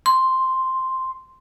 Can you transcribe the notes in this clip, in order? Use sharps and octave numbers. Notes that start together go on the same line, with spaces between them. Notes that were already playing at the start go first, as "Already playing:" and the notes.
C6